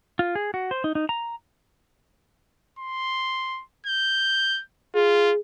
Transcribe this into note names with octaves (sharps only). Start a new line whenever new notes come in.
F4
G#4
F#4
C5
D#4
D#4
A#5
C6
G6
F4 G#4